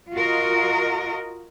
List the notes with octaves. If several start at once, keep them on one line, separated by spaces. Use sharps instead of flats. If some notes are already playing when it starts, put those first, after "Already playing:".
F4 F#4 A#4 D#5